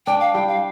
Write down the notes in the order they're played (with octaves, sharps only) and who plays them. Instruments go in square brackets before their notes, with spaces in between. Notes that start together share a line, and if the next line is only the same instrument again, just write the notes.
[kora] D4 [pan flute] G5
[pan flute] F5
[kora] G3 [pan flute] G5
[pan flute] F5